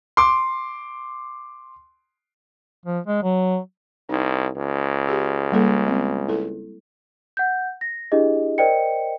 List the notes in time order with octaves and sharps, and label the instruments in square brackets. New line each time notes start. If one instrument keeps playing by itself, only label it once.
[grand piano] C6 D6
[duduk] F3
G#3
F#3
[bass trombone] C2 [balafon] D#4
[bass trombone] C#2
[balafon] G4 G#4
G3 A#3 A4
G#3 C4
E4 A4
[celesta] F#5 G6
A#6
D4 E4 G4 G#4 D#5
A#4 C5 D5 D#5 G5 C#7